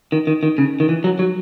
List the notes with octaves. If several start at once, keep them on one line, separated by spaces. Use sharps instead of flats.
D#3
D#3
D#3
C#3
D#3
E3
F#3
F#3